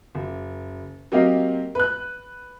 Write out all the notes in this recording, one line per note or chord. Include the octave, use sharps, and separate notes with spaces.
F#1
F#3 A#3 C4 G4 D#5 F5
B4 F#6